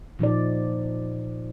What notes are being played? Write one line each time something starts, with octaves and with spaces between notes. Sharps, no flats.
A#2 F3 D#4 D5